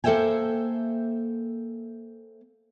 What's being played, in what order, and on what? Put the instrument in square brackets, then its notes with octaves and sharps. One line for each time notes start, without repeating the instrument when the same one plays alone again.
[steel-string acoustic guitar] A#3 A4 C5 E5 G5 G#5